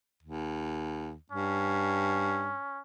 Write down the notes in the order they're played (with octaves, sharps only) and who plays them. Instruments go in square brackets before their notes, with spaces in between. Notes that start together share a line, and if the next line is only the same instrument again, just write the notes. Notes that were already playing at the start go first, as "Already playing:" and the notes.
[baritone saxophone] D#2
[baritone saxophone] G2 [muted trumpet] C#4